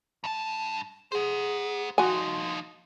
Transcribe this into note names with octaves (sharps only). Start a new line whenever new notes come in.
G2 A5
G#4 C5 F#5
F3 D#4 F#4 G#5 C6